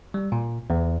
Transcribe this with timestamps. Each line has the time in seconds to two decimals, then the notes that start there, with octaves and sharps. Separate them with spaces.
0.14 G3
0.32 A#2
0.70 E2